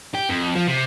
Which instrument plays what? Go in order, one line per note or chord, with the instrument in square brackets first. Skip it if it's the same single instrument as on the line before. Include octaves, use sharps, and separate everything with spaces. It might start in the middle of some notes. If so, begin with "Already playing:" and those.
[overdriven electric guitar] G4
F2
F3
C3